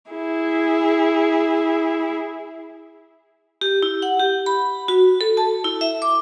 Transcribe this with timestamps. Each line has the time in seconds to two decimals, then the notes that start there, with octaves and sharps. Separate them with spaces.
0.11 E4 G#4
3.61 G4
3.82 E4
4.02 F#5
4.19 G4
4.46 B5
4.88 F#4
5.21 A4
5.37 A5
5.64 E4
5.81 E5
6.02 D6